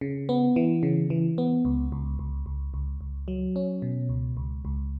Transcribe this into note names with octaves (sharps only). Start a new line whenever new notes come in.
C#3
B3
E3
C#3
E3
B3
C#2
C#2
C#2
C#2
C#2
C#2
F#3
C#4
B2
C#2
C#2
C#2